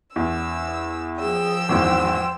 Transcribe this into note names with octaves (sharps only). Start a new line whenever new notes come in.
E2 E6
F3 G#4 G5 E6
G#1 E2 G#2 C5